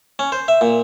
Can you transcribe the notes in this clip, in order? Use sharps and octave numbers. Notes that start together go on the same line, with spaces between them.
C#4
C5
E5
A#2